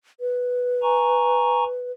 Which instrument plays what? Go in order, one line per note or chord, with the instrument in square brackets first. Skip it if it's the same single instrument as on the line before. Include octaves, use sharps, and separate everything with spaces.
[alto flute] B4
[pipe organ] G#5 A#5 C#6